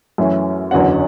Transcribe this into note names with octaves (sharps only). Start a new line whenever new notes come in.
F#2 E3 A3 C#4 E4
F#1 E2 D3 F#3 C#4 F#5